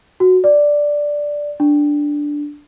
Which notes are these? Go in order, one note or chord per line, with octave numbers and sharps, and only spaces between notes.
F#4
D5
D4